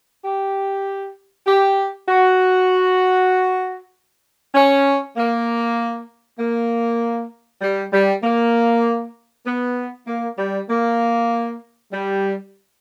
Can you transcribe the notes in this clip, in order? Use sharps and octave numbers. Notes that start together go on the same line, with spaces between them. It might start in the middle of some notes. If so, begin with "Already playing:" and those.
G4
G4
F#4
C#4
A#3
A#3
G3
G3
A#3
B3
A#3
G3
A#3
G3